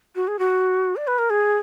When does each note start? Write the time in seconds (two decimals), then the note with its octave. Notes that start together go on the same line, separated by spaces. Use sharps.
0.15 F#4
0.28 G#4
0.39 F#4
0.96 D5
1.07 B4
1.18 A#4
1.30 G#4